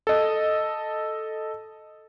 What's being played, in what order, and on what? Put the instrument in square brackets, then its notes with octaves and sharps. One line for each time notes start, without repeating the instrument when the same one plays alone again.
[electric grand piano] A4 D#5